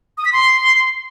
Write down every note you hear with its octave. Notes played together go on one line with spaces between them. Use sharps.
D#6
B6
C6